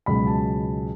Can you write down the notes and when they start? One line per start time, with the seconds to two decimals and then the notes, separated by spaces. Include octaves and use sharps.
0.06 C#2 B2 F#3 B5
0.27 A5